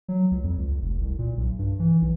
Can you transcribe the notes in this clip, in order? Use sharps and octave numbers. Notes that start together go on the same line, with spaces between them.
F#3
C#2
F2
C#2
F1
C2
A#2
B1
G2
E3
B1